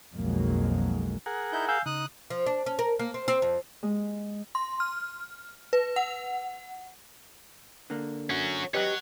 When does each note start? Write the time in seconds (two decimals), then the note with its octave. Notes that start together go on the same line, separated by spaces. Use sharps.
0.15 B1 F2 D#3 F#3 G#3 A#3
1.26 G#4 A#4 F#5
1.52 D#4 E4 G6
1.68 F5 G#5 E6 G6
1.86 C#3 D#4 D#6 F#6
2.30 F3
2.46 D4
2.66 C#4
2.79 A#4
2.99 A#3
3.14 C4
3.28 C4
3.42 F2
3.83 G#3
4.55 C6
4.80 F6
5.73 B4
5.96 F#5
7.90 D3 A#3
8.30 C#4 F#4
8.74 G4 B4 C#5 D#5 F#5